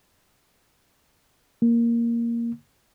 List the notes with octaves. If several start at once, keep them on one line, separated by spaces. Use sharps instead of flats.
A#3